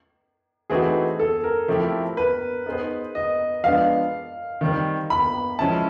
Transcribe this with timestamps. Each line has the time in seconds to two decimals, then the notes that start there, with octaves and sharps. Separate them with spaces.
0.70 E3 A3 C4 D#4 F#4 G#4
1.19 A4
1.44 A#4
1.68 F3 A3 C4 E4 G4
2.17 B4
2.66 B3 D#4 G#4 C5
3.15 D#5
3.64 F3 G#3 B3 D4 F5
4.61 D#3 G3 C4
5.10 B5
5.59 F3 G#3 C#4 E4 A5